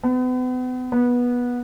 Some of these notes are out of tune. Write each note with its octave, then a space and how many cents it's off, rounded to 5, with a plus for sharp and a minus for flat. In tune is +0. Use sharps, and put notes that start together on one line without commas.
B3 +40
B3 -15